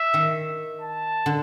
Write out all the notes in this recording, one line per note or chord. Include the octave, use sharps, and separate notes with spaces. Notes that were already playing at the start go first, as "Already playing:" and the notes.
Already playing: E5
D#3
A5
D3